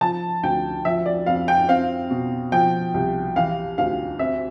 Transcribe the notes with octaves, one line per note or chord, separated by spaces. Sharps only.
F3 A5
D2 G5
F3 E5
D5
F2 F5
G5
C4 F5
B2
F3 G5
C2
E3 F5
D2 F5
C4 E5